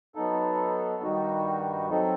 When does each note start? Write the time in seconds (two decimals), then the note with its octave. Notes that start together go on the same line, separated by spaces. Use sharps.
0.15 F#3 B3 D#4 A4
1.03 G2 D#3 G3 D#4 F#4
1.90 F#3 C4 D#4 A4